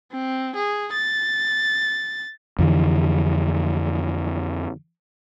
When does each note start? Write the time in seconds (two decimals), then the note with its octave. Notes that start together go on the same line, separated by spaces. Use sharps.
0.12 C4
0.55 G#4
0.92 A6
2.59 F2 D3 E3